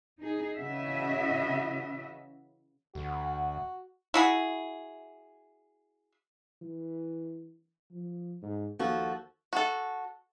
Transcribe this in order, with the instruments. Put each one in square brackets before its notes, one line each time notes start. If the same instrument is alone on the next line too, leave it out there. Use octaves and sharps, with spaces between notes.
[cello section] D#4 G#4
C#3 E3 C#4 F#4 D#5 E5
[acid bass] D2 [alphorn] F#4
[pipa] E4 F#4 G#4
[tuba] E3
F3
G#2
[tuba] D#2 [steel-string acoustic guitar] F3 F#4 A4
[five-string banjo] F#4 A4